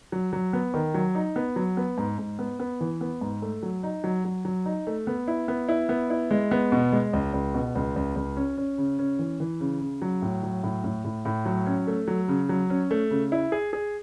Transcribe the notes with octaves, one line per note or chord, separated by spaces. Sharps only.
F#3
F#3
B3
D#3
F#3
D#4
B3
F#3
B3
G#2
G#2
B3
B3
E3
B3
G#2
A3
F#3
D#4
F#3
F#3
F#3
D#4
A3
B3
E4
B3
E4
B3
E4
G#3
B3
B2
G#3
C#2
C#2
B2
C#2
C#2
C#2
C#4
C#4
C#3
C#4
E3
E3
C#3
C#3
F#3
A2
F#3
A2
A2
A2
A2
F#3
C#4
A3
F#3
C#3
F#3
C#4
A3
C#3
E4
G#4
G#4